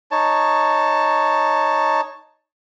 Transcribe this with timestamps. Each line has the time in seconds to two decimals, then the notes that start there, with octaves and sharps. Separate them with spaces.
0.11 D#4 C#5 A5